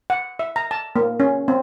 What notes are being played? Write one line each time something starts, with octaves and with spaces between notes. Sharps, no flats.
F#5
E5
A#5
A5
A#3
C#4
C4